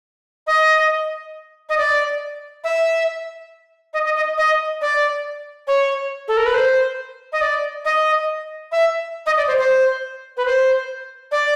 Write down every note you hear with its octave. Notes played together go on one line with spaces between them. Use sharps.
D#5
D#5
D5
E5
D#5
D#5
D#5
D#5
D5
C#5
A4
A#4
B4
C5
D#5
D5
D#5
E5
D#5
D5
C5
C5
B4
C5
D5